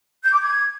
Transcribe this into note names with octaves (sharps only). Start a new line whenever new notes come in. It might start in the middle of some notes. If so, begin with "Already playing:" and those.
G6
D6
G#6